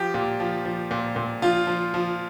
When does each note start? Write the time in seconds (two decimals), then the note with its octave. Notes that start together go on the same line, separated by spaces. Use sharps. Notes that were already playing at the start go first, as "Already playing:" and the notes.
Already playing: F3 G4
0.14 A#2
0.40 F3
0.65 F3
0.91 A#2
1.16 A#2
1.42 F3 F4
1.67 F3
1.94 F3